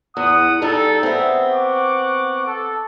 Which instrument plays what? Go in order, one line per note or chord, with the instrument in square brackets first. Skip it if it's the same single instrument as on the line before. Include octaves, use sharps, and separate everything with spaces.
[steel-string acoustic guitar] E2 [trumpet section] F#5 D#6
[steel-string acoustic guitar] G3 D#4 G#4 [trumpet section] A4
[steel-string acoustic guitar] B3 C4 [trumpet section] G#4 E5
[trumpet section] F#5 C#6 D6
A4